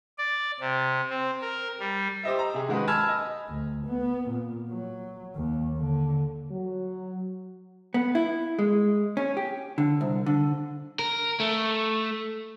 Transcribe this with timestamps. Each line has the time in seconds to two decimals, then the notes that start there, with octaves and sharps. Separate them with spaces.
0.18 D5
0.60 C3
1.10 C4
1.41 A#4
1.80 G3
2.23 G4 C5 D#5 E5
2.39 A#5
2.54 C3 G#4
2.69 D#3 G#3 F#4 G#4 B4
2.87 G#5 A5 B5 E6 F6 G#6
3.09 D#5
3.48 D2
3.86 B3
4.30 A#2
4.69 F#3
5.35 D#2
5.77 D3
6.52 F#3
7.94 B3
8.15 E4
8.59 G#3
9.17 C#4
9.37 G4
9.78 D3
10.01 C2
10.26 D3
10.99 A#4
11.40 A3